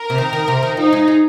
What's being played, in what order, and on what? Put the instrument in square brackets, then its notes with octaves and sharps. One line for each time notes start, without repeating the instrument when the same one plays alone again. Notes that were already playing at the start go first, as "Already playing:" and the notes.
Already playing: [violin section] A#4
[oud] C3
D#3
D#3
C3
D#3
[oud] F3 [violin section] D#4
[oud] G#3
G#3